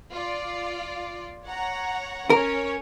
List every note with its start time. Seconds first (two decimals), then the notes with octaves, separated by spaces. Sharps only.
0.12 F4 D5
1.44 C#5 F#5 A#5
2.30 C#4 A#4 C#5